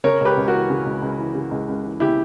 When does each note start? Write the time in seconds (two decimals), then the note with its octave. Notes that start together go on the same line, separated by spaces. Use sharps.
0.04 C#3 A#4 C#5
0.21 C#2 G4 B4
0.37 C#2
0.48 E3 F#4 A#4
0.70 C#3
0.86 C#2
1.02 C#2
1.19 E3
1.35 C#3
1.51 C#2
1.68 C#2
1.84 E3
2.00 C#3 E4 G4